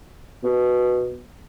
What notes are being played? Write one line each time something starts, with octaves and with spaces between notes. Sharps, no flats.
B2